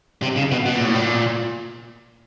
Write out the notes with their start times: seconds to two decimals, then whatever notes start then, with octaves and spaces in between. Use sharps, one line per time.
0.22 C3
0.37 C#3
0.51 B2
0.66 B2
0.75 A#2
0.85 A2
0.95 A#2